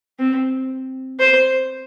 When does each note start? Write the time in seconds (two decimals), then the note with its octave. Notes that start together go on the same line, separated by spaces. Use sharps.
0.19 C4
1.20 C5